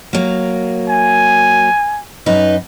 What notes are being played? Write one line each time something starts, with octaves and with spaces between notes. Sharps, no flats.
F#3 A#3
G#5
F#2 D#4 B4